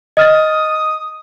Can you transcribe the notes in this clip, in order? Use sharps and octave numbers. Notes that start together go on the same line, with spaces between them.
D#5 D#6 F6 A6